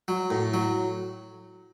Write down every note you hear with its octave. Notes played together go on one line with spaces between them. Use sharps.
F#3
A2
F#3